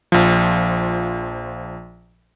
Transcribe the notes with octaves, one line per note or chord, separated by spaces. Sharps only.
A#1 F3